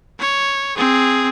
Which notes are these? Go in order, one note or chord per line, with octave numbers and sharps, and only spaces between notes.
C#5
C4 G#4